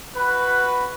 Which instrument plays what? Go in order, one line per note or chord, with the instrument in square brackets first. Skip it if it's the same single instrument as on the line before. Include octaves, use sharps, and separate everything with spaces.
[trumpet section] F#4 B4